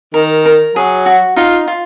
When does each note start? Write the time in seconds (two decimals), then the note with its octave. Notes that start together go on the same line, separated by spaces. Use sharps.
0.14 D#3 A#4
0.45 A#4
0.76 F#3 G#4
1.06 F#4
1.36 D#4 F4
1.68 F4